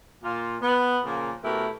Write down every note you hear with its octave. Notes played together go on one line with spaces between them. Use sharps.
A#2 F4
B3
A#2 C#3 F3 A#3
B2 A3 E4 G4 A#4